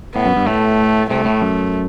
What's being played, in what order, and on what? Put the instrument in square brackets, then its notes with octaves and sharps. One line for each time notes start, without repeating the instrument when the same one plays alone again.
[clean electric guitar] A2 [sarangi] B3
[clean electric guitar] F#2
G2
[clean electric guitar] A2 [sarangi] A3
[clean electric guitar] C2 C3 [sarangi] A3
[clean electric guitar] A2
F#2